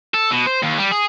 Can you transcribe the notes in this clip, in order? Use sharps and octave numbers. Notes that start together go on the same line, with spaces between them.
A4
B2
C5
D#2
G3
G#4